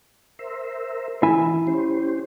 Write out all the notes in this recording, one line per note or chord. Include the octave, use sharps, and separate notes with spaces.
A#4 C5 E5
E3 E4 E5 G#5
C#4 G4 C5